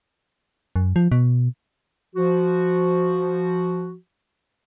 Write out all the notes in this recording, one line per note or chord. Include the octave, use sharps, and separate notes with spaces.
F#2
F3
B2
F3 F#4